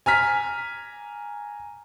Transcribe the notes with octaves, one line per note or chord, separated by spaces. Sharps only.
G#5 A#5 F6 B6